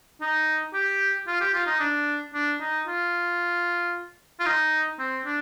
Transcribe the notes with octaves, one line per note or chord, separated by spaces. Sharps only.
D#4
G4
F4
G4
F4
D#4
D4
D4
D#4
F4
F4
D#4
C4
D4